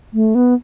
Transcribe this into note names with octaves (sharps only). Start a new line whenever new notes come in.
A3
B3